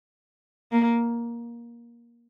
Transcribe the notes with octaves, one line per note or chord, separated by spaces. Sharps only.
A#3